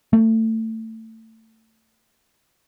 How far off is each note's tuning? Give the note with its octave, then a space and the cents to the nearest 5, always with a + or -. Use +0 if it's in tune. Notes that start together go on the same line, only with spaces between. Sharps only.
A3 +25